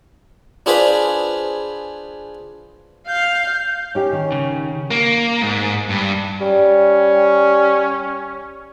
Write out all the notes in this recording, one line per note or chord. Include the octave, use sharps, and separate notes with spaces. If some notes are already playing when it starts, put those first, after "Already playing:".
D4 F4 G#4 B4 C5 B5
F5 G6
C#4 D#4 G4
D#3
C#3
A#3
G#2
G2
G3 C#4